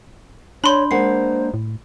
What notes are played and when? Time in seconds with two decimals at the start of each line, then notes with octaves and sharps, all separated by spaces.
0.64 D4 C#5 B5 C6 G6
0.91 G#3 A#3 C5 F#5 C7
1.54 A2